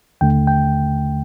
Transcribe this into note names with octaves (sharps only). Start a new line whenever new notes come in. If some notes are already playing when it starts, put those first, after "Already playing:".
D#2 D3 A3 G5
G5